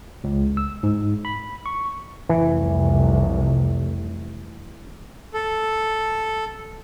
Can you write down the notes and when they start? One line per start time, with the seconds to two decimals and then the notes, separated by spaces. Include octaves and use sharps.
0.24 C#2
0.57 E6
0.83 G#2
1.25 B5
1.66 C#6
2.29 F1 C2 E3
5.34 A4